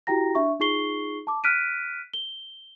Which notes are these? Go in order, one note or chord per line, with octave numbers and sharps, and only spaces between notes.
E4 F#4 G4 G5 A#5 A#6
D4 E5 C#6
D#4 F4 G#4 C#6 C7 G7
A5 D6
F6 F#6 B6 D7 D#7
G7